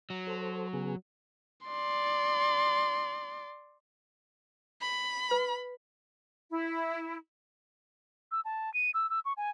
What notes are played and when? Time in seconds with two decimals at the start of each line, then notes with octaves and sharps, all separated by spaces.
0.10 F#3
0.27 A4 C5
0.73 C#3 B3 G#4
1.67 D5 C6
4.82 B5
5.31 B4
6.50 E4
8.32 E6
8.45 A5
8.74 D#7
8.94 E6
9.10 E6
9.25 C#6
9.37 G#5